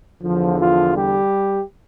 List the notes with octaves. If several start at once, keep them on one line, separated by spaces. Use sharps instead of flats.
E2 D3 F3
F3 F4
G3 G4